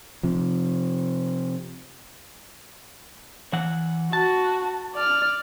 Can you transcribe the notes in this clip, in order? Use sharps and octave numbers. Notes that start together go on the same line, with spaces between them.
C3 F3
E3 F#5
F#4 A5
D5 F6